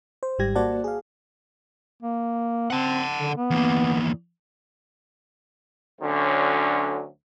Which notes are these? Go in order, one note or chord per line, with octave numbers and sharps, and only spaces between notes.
C5
G#1 G#2 G3 G4 G#6 A#6
A#3 F#4 C5 D5 F#5 A5
G#4 F5
A#3
C4 F#5 A5
D3
B3
E2 A#3
D2 D3 F#3 C#4